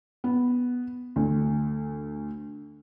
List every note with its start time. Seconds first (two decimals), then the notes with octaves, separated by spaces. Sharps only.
0.24 B3
1.16 D2